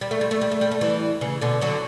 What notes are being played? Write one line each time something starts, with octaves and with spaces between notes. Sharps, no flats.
G3
A3
G3
A3
G3
A3
G3
A3
E3 G3
C#3 E3
B2 D3
D3 F#3